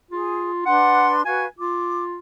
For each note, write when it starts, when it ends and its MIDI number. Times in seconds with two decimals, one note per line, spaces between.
0.11 0.62 65
0.11 0.49 68
0.66 1.24 62
0.66 1.24 71
0.66 1.10 78
0.66 1.24 84
1.26 1.46 66
1.26 1.46 71
1.26 1.46 77
1.26 1.46 80
1.59 2.19 65
1.59 2.03 86